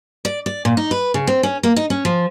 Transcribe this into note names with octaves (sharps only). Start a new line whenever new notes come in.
D5
D5
A#2
D#4
B4
C#3
C4
C#4
A#3
D#4
C#4
F3